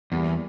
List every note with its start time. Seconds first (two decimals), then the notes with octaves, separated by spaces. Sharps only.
0.12 E2 G3 A#3